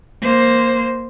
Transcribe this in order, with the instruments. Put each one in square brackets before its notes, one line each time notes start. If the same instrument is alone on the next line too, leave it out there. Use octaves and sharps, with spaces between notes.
[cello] A#3 C5